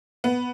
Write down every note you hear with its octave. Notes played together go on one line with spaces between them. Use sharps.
B3